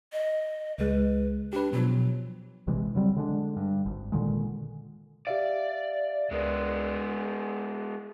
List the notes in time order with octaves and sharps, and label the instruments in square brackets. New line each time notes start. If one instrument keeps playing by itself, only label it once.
[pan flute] D#5
[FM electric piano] C#2 G#3 [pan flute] B4
[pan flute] D4 [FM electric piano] G4 B4
[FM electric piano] B2 F3 [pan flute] F#3
[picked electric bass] A#1 C3 E3 G#3
C#3 F#3 G3 C4
D3 G#3 D4
G2
G#1
A#2 D3 D#3 G#3
[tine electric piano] G4 E5 F5 [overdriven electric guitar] D5
[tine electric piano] C#2 A#4 D5 [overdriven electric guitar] G#3 B3
[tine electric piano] G#4